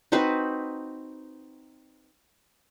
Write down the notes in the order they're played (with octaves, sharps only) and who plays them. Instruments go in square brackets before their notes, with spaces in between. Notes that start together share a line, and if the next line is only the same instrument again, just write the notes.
[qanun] C4 D#4 F#4 B4